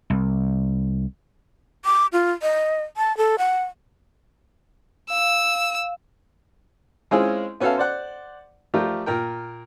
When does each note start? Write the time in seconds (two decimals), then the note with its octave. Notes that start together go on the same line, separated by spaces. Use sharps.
0.10 C2
1.85 D6
2.13 F4
2.42 D#5
2.97 A5
3.17 A4
3.39 F#5
5.10 F5 E6
7.11 G#3 C4 C#4 E4 F4 G#4
7.60 B3 C#4 F#4 A4 E5 F5
7.78 C5 D5 F#5
8.74 F3 A3 F4 G4 A#4 D5
9.06 A#2 A#4 G5